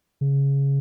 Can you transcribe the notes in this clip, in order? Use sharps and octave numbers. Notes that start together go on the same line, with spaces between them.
C#3